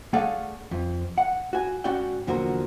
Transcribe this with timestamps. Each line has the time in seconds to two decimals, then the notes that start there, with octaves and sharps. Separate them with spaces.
0.13 A3 G#4 A4 D5 F5 F#5
0.71 F2
1.18 F#5
1.53 F#4 G#5
1.84 G#2 C#4 F#4 D5 F#5 G5
2.27 E2 A#2 D3 F3 F#4 A#4